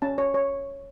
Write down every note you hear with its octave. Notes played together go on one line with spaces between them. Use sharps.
C#4 A5
C#5
C#5